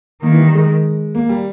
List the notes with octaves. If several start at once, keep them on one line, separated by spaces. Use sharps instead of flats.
D#3 A#3
E3
G3
G#3
A#3
G3